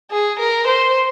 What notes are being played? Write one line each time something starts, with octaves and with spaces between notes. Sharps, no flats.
G#4
A#4
C5